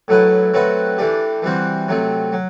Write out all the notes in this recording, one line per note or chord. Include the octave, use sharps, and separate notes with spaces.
A2 F#3 A3 E4 B4
F#3 A3 C4 F#4 B4
E3 A3 D4 G4
E3 G3 C4 F#4 C5
C3 F#3 A3 C4
F#3